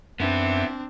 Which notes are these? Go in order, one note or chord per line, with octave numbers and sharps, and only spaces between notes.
F#2 B3 C4 D4 E4